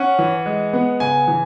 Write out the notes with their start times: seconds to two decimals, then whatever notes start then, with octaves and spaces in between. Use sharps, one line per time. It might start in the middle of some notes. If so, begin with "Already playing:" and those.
Already playing: C#4 F#5
0.19 E3
0.46 G#3
0.73 B3
1.00 C#3 G#5
1.28 E3